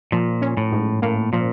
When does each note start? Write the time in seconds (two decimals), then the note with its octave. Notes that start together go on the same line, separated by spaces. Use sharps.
0.12 A#2 F3
0.42 C#4
0.57 A2
0.72 G#2
1.02 A2 A#3
1.33 A#2 F3